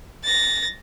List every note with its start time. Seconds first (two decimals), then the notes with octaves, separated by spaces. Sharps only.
0.24 A6 A#6